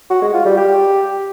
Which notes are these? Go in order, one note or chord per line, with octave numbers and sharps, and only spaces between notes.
F#4
G#3
F4
G3
G4